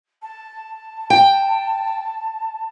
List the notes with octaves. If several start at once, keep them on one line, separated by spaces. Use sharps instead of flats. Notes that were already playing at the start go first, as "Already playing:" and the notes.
A5
G5